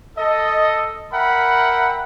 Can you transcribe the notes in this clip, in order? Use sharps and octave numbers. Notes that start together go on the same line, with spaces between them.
A4 D#5
A#4 E5 F#5 G5 B5